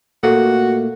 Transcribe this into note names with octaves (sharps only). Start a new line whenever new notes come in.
A#2 A3 A#3 F#4 A4